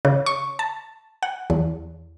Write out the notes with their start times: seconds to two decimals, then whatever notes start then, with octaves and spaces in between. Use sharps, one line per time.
0.05 C#3
0.26 C#6
0.59 A5
1.23 F#5
1.50 E2